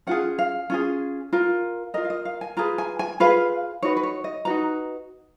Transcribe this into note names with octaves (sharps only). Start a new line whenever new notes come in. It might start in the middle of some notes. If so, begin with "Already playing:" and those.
C#4 F4 G#4 F#5
F5
C#4 F4 G#4
F4 A#4
F4 A#4 D#5
F5
D#5
F5
G#5
F4 G#4 B4 A#5
G#5
G#5
F4 G#4 B4 F5
D#4 F#4 B4 C#5
B4
C#5
D#5
D#4 F#4 B4 A#5